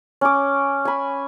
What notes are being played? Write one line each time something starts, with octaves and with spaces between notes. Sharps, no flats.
C#4 D6
G#5 B5